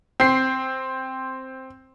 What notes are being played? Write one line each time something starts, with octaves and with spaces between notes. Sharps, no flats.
C4 C7